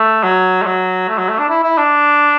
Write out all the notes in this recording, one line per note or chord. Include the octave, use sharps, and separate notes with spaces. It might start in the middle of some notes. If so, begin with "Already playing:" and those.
Already playing: A3
F#3
A3
F#3
A3
F#3
A3
D4
E4
E4
D4